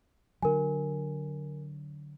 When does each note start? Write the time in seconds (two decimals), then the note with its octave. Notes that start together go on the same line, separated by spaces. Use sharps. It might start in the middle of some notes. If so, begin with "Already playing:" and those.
0.43 D3 F#3 A#4 G#5